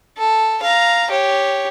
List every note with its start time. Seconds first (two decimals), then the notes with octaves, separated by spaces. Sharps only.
0.18 A4
0.62 F5 A#5
1.10 G4 C#5